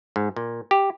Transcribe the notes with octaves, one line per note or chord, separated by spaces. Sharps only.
G#2
A#2
G4